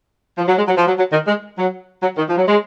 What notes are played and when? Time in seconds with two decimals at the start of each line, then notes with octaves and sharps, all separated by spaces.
0.38 F3
0.48 F#3
0.57 G#3
0.67 F#3
0.77 F3
0.87 F#3
0.98 F#3
1.12 D#3
1.27 G#3
1.57 F#3
2.02 F#3
2.17 D#3
2.28 F3
2.37 F#3
2.47 G#3